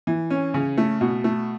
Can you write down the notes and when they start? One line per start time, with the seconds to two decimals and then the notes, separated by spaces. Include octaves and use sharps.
0.07 E3
0.30 C#4
0.54 C#3
0.77 A3
1.01 B2
1.24 A3